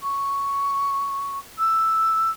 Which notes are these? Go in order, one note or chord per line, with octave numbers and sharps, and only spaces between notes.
C#6
E6